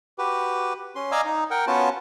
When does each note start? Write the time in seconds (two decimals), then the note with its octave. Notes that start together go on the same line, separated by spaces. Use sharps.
0.18 F#4 G4 B4
0.96 C#4 C6
1.12 D5 D#5 F5 G#5 A#5 E6
1.25 D#4
1.51 A#4 F#5 G5
1.67 B3 C#4 F4 F#4 A5